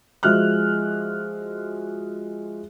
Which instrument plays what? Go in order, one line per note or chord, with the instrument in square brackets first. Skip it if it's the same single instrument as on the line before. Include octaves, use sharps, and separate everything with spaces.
[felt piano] F3 G#3 F#4 E5 F6 F#6